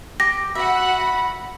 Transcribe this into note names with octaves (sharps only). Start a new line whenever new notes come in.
G4 A#6
F#4 E5 F#5 B5